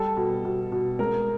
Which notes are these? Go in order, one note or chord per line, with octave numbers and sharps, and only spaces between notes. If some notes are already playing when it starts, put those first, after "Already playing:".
Already playing: G3 A4
B2
B2
B2
G#3 A#4